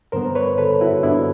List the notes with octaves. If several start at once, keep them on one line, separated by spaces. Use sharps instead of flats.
G2 D3 G3 B3 A#4 C5
B4 C#5
A4 B4
E4 F#4
G2 D3 G3 B3 D4 E4